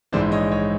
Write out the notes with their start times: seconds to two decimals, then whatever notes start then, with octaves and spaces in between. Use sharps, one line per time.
0.12 A#1 G#2 E3 C5 D5
0.32 C#5 D#5
0.52 C#5 D#5